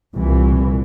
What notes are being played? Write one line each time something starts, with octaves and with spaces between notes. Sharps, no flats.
C2 A#2 E3